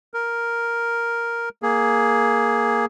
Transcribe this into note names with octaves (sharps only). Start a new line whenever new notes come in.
A#4
A#3 G#4